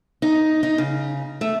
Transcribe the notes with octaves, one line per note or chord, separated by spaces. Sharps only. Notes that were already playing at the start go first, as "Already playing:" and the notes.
D#4
D#4
C#3
A3